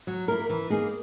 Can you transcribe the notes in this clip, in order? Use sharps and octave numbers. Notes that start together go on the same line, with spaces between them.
F#3
A#3 E4 A#4
E3
A#3 D#4 G#4